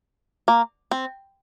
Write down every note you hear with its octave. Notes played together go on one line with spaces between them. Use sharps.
A#3
C4